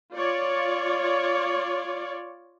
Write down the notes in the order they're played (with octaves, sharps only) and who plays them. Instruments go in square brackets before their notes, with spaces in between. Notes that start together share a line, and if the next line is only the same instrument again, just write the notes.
[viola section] F4 C#5 D5